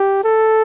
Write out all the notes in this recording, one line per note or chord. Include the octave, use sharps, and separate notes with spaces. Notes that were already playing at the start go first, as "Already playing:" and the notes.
Already playing: G4
A4